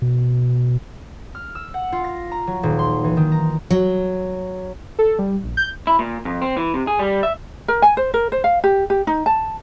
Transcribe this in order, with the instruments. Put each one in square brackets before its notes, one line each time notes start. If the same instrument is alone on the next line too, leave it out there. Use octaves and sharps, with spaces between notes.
[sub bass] B2
[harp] F6
E6
F#5
F4
A#6
A#5
F#3
D#1
C6
E3
D#3
A#5
[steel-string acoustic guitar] F#3
[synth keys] A4
G3
A#1
G6
[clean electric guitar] E4
A#2
F2
C4
E3
C3
G#4
G3
E5
[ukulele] A#4
G#5
C5
A#4
C5
F5
G4
G4
D#4
A5